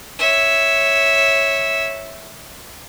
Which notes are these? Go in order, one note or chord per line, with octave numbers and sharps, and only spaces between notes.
C#5 E5